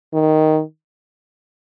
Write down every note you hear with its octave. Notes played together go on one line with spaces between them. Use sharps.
D#3